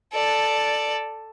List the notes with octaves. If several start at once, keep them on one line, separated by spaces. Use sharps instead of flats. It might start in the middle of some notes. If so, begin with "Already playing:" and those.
A4 D5